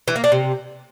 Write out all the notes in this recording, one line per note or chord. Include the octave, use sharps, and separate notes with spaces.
E3
A#3
D4
C3